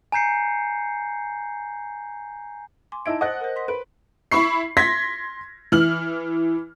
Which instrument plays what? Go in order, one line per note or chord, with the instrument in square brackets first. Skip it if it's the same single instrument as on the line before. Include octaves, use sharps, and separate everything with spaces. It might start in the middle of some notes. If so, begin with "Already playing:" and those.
[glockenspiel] G#5 A#5 G6 C7 C#7
[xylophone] G#5 C6 D6
[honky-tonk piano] D#4 E4 D7 [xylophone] A5 E6 G#6
[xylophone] C5 A6 [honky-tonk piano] D#5 F#5 F#6
[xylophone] A#4 C5
C6 B6
[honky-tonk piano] B4 [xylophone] D7
[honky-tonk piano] E4 B5 C#6 C7
C6 G#6 A#6 B6
E3 F6 F#7